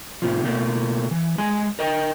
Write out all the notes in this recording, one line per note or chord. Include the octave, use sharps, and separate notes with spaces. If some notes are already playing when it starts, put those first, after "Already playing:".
A2 C3 F3
B2 A3 A#3
E3
G#3 G#5
A#4 D#5 G5